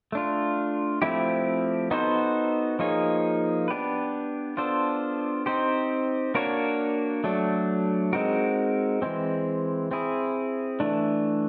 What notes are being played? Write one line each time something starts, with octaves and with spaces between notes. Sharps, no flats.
A3 D4 F4
F3 A3 C4 E4 G4
B3 D#4 F#4 A4 C5
F3 A#3 D#4 G#4 C#5
B3 D4 G4 B4
B3 D4 F4 A4 C5
C4 D#4 G4 C5
A#3 D4 F#4 A#4 C#5
F#3 A3 D4
G#3 C4 D#4 F#4 A#4
E3 G#3 C4
C4 E4 G#4
E3 A3 D4